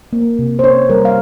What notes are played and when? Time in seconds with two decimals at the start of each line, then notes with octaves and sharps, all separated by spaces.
0.13 A#3
0.39 C3
0.59 C5
0.64 C#4 C#5
0.90 G3 A#4
1.05 F5